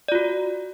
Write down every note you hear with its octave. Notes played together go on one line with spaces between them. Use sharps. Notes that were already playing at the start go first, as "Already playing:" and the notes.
F4 F#4 D5